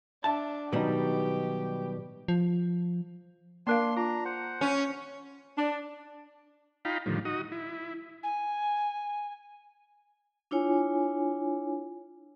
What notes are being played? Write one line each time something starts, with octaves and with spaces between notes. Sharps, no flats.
D4 E5 A5
B2 D#3 F#3 G3 D#4 G4
F3
A#3 D4 A#4 F5 C6
D4 F4 A#5
C5 F#5
C#4
D4
D#4 F4 F5 G5 A#5 B5
A2 D3 D#3 F3 G3
D#4 F#4 D#6
E4
G#5
D4 E4 F4 C#5 G#5